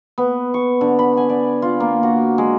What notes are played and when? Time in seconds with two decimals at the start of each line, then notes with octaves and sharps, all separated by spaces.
0.18 B3
0.54 C#6
0.81 D3
0.99 B5
1.17 G#5
1.30 D5
1.62 F4
1.80 A#3
2.03 F#4
2.38 G#3